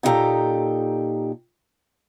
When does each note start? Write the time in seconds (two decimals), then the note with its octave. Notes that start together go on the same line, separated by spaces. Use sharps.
0.03 A#2 D#4 E4 G4 A4 A#5